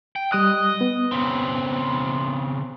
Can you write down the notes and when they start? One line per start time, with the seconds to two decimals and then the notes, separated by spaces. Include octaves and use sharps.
0.16 G5
0.32 G3 D#5 D#6 F#6
0.81 B3
1.12 C#3 C4